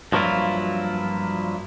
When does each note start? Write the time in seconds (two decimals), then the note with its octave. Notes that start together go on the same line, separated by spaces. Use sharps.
0.12 G2 F3 F#3 A#3 E4 F4